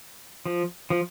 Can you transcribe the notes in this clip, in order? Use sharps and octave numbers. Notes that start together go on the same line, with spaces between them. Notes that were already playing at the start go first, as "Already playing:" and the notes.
F3
F3